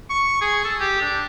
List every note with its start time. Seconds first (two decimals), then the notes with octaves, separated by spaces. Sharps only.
0.10 C#6
0.41 G#4
0.65 A4
0.81 G4
1.01 D4